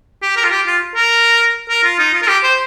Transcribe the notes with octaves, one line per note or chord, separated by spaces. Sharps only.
G4
A#4
F4
G4
F4
A#4
A#4
F4
D#4
F4
A#4
G4
C5